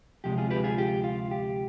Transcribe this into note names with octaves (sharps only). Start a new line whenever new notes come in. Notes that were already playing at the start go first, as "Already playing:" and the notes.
D2 C3 F3 G#3 G4
F4 G#4
G4 B4
F4 G#4
G4
F4
G4